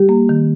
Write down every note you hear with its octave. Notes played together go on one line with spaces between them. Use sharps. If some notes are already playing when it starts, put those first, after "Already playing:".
Already playing: G3 G4
A#3
D#3